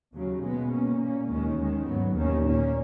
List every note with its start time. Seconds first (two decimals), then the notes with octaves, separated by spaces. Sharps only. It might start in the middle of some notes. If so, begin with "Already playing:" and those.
0.14 D#2 C#3 F#3
0.43 B2 G#3 B3
0.72 B2 A#3 C#4
1.00 A#2 A#3 C#4
1.29 D#2 D#3 G#3 C#4
1.57 D#2 D#3 G#3
1.86 G#2 F#3 B3
2.15 D#2 D#3 A#3 C#4
2.44 A#2 A#3 C#4